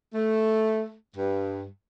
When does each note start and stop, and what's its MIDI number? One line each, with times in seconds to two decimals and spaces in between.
0.14 0.93 57
1.17 1.65 43